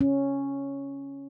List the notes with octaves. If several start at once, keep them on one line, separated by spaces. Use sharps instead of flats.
C#4